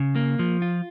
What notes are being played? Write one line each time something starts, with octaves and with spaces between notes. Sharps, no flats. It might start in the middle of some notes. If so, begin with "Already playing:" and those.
Already playing: C#3
A#3
F3
F4